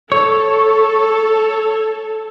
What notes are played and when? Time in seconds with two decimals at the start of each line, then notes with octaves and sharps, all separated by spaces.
0.12 A4 C#5